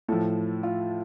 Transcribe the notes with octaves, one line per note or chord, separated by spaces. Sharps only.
A2 F3 A4
F4